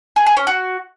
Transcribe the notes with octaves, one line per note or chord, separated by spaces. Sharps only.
G#4
G#4
C#4
F#4